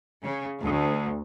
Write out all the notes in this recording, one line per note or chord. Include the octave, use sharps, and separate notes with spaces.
C#3
D2